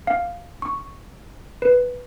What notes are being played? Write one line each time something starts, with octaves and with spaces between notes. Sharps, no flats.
F5
C#6
B4